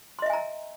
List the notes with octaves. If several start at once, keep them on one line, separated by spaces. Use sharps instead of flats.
D#5 E5 G#5 A#5 C6